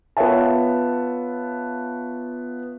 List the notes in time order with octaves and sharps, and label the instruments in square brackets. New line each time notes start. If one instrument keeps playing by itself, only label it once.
[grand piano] B3 F4 C#5 E5 A5